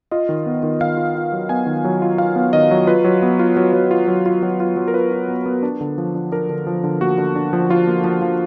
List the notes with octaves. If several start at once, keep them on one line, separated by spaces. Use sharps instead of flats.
F4 D#5
D#3
B3
D#3
D#3 F5
F4
F4
F#3
B3 G#5
D#3
F#3
F4
F4 F5
B3
D#3 D#5
F#3
F4 B4
F#3
B3
F4
F#3
F#3
F4
F#3
F4
F#3
F4
F#3
A#4
F4 B4
F4
B3
B3
D4
D3
F3
D4
D4 A#4
D3
F3
D3
A#3 F#4
D3
D4
F3
F3 F4
A#3
F3
F3